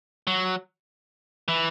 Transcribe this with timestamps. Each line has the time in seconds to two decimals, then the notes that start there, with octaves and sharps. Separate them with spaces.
0.27 F#3
1.48 E3